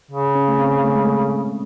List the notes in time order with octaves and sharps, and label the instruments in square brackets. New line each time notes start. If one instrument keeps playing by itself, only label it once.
[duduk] C#3
[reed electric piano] C#4
A3
C4
A3
G#3
A3